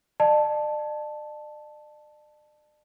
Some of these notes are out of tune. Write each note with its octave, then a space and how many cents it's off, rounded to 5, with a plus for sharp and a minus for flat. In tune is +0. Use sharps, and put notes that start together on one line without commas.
D5 +40 A5 +0